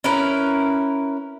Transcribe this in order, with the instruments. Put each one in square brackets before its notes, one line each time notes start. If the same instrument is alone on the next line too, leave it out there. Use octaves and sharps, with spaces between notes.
[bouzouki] C#4 E4 A#4 B4